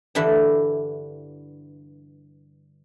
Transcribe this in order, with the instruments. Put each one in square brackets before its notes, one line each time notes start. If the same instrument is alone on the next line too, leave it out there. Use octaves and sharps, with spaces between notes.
[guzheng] G2 D3 E3 D4 E4